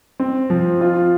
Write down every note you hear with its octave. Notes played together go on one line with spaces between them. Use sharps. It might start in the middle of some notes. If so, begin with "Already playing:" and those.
C4
F3
F4